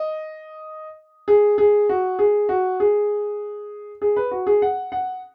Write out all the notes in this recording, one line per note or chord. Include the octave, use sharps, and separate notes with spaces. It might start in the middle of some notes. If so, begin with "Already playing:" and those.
Already playing: D#5
G#4
G#4
F#4
G#4
F#4
G#4
G#4
B4
F#4
G#4
F#5
F#5